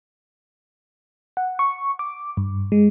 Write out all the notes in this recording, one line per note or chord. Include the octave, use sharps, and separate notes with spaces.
F#5
C#6
D6
G2
G#3